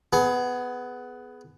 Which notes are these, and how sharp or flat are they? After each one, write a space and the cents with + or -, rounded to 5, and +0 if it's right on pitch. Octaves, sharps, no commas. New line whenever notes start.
B3 +10 G#4 +25